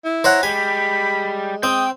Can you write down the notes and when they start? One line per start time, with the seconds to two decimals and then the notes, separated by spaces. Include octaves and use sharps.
0.05 E4
0.24 C5 C#5 F#5 A#5
0.43 G3 G#3 G#5 B5
1.63 C4 G5 D#6